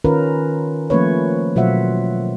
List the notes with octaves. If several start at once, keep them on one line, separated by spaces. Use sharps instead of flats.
D#3 C#4 F4 A#4 B4
F3 A3 A#3 C#4 B4 C#5
B2 F#3 F4 C5 E5 F#5